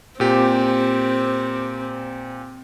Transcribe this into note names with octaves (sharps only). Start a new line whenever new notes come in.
A#2 C4 G4